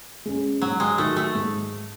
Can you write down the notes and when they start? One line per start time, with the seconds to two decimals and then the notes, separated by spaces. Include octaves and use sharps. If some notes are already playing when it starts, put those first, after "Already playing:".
0.26 G#3 C#4
0.62 G#2 F#3
0.80 G#3
0.98 D#3 F#3 A3
1.16 A3
1.35 G#2